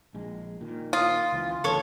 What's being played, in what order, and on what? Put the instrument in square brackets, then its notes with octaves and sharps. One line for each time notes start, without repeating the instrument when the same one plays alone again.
[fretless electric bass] A#1 G#3
A#2 D#3
[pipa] F4 [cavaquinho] D#6
[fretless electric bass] C#2 E3
[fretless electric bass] A1 D2 [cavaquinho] A4 C#5